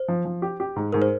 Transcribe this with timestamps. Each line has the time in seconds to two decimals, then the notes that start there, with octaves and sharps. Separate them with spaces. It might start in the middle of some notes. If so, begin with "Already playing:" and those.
Already playing: C5
0.08 F3
0.25 F3
0.42 G4
0.60 G4
0.76 G#2
0.93 G#2 A#4
1.02 C5